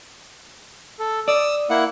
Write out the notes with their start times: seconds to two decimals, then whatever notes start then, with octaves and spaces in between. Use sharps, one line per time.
0.99 A4
1.28 D5 D#6 E6
1.70 A#3 E4 F#5